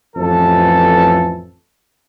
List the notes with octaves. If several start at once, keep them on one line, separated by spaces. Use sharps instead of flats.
A1 F2 E3 A4